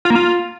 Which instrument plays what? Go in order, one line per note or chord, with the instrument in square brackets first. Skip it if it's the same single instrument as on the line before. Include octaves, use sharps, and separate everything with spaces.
[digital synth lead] F4
A#3
F4